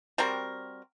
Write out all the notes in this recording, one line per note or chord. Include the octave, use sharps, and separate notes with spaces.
G3 C4 F#4 A#4